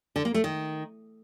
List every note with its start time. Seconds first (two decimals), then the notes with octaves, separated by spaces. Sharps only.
0.16 D3
0.25 A#3
0.34 A3
0.44 D#3